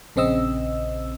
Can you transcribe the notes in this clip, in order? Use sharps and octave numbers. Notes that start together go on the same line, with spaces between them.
A#1 C#3 C4 D#5 E6